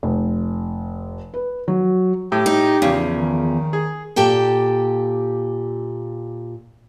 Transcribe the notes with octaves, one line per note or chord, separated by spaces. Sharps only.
F1
B4
F#3
A2 G4
D#4
E2 C#3 F3
D#3
G#4
A#2 G4 A4 G5